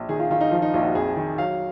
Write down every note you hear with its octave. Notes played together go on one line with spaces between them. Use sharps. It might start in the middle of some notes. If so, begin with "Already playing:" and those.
Already playing: A#1
D#3 G#4
F4
D#3 F4
D#4
F3 F4
D#4
A#1 F4
F#4
F2 G#4
D#3
F#3 F5